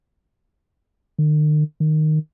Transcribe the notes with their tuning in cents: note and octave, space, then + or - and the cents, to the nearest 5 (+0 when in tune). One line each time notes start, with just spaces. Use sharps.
D#3 -45
D#3 -10